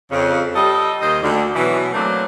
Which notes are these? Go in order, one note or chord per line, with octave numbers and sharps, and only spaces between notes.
F2 C#3
G3 A4 D#5
D#2 D#3 C5 D#5
D2 D3
B2 E3 F#3
E3 F#3 A3 A#3 C4 D4